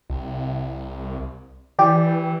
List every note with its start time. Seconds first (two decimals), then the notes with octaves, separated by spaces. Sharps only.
0.10 C2
1.79 E3 G4 D5